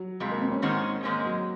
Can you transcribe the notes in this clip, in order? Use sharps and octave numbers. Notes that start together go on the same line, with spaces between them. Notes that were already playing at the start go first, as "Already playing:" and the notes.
Already playing: F#3
F2 C3 G#3
A#3
C4
C#4
G#2 D#3 G#3 C4 C#4
G#2 D#3 G#3 A#3 C#4
F#3